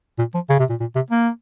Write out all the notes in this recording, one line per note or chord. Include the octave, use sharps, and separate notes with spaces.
A#2
F3
C#3
C3
A#2
A#2
C3
A#3